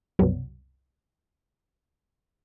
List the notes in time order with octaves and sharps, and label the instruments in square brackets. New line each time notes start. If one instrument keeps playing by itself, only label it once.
[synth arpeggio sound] C2 F#2 B2 F#3 G3 B3